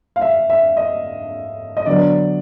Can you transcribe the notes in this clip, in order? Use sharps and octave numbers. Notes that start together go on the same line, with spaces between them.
F5
E5
E5
D#5
D#5
D3 F#3 B3 D5